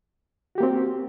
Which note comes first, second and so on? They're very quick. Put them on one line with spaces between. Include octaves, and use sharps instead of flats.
F#4 G4 A#3 C4